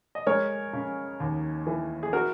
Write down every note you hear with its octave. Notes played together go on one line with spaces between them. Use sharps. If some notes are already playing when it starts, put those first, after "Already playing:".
D#5
G#3 A#4 C#5
C#3
D#2
E3
G#4
F#4 A#4